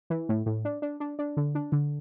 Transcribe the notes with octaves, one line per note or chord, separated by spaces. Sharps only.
E3
A2
A2
D4
D4
D4
D4
D3
D4
D3